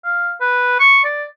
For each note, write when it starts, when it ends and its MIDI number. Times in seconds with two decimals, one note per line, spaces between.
0.05 0.33 77
0.41 0.79 71
0.80 1.02 85
1.04 1.25 74